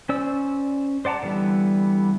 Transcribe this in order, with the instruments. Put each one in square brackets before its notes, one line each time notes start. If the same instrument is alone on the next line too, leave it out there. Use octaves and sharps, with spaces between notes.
[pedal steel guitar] C#4 C5 D5 E6
C5 D5 F#5 A5 A#5
D3 E3 G3 B3